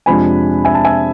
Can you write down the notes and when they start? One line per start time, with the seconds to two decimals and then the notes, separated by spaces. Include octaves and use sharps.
0.06 F2 C3 F3 G#3 D4 G#5 B5
0.65 E5 G#5
0.74 A5
0.85 E5 G#5